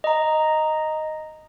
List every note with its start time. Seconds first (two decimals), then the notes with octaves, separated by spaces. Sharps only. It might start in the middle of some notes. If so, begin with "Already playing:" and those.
0.04 D#5 A#5